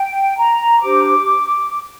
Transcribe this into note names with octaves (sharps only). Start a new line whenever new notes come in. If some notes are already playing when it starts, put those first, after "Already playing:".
Already playing: G5
A#5
D4 G4 C5 D6